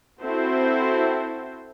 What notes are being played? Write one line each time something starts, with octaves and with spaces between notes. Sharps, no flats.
C4 E4 F#4 A4 C5